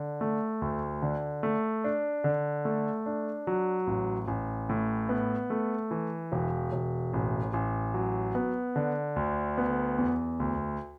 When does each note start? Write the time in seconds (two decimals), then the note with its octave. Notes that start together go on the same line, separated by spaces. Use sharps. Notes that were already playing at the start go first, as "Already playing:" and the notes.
Already playing: D3
0.21 A3
0.62 D2
1.02 D3
1.43 A3
1.84 D4
2.24 D3
2.65 A3
3.06 D4
3.47 F#3
3.87 A1
4.28 A1
4.69 A2
5.09 B3
5.50 A3
5.91 E3
6.32 E1
6.73 E1
7.13 A1
7.53 A1
7.94 F#3
8.35 B3
8.76 D3
9.16 D2
9.58 B3
9.98 E2
10.40 D2